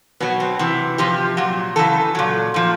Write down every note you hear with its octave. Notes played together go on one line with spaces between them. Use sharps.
B2 F#3 B3
C4
C3 E3
C3 F3 G4
A#2 F#3
C#3 E3 A4
A#2 F#3
A#2 F3